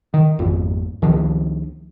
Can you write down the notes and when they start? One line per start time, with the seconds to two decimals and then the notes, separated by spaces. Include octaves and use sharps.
0.14 D#3
0.39 G#1 F2
1.02 C#2 D#3 F3